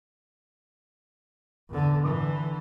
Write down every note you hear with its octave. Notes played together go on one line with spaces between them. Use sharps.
E2 D3
D3 E3